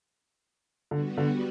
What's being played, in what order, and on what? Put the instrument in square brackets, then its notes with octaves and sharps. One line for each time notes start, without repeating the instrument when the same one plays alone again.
[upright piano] D3 [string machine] G3 B3 F#4
[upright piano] D3